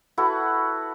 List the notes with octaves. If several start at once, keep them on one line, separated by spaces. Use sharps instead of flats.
E4 F#4 A4 B4